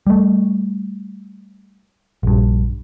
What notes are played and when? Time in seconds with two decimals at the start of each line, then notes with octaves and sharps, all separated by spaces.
0.07 G3 A3
2.23 A#1 G2